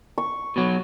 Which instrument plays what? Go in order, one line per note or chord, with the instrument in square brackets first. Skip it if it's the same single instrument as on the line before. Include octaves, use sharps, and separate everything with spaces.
[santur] C#6
[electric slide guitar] B2 F#3